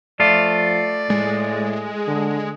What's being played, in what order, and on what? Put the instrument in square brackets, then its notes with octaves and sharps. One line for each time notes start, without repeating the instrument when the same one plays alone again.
[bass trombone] F3 [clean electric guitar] A3 F4 [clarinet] D5
[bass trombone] A2 [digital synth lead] G#3
[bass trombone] D3